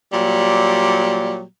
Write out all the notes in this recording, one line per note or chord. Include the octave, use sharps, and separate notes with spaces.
A#2 F#3 G3